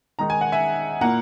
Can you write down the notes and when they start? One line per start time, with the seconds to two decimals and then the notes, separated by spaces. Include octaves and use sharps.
0.19 D#3 G#3 D#4 A#5
0.30 G#5
0.41 F#5
0.52 E5 G#5
1.01 A#2 A#3 E4 F#5 A#5